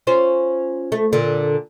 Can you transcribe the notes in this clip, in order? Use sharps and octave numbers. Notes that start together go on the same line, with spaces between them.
C#4 F4 C5
A3
A#2 D3